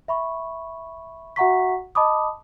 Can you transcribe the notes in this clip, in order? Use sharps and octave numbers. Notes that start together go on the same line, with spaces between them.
E5 B5 C#6
F#4 E5 F#5 A#5 C#6 B6
D#5 A5 B5 D6 D#6